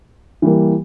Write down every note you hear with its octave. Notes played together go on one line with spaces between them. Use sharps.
E3 G3 A#3